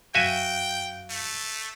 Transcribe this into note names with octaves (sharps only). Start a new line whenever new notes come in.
F#2 F#4 E5 F5 G5 G#5
A3